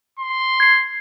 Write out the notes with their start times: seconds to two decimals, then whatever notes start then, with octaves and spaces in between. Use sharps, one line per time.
0.20 C6
0.60 G#6 C7